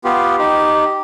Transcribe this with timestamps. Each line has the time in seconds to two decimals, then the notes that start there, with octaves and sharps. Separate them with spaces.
0.04 B3 F4 G4
0.39 D#4 G4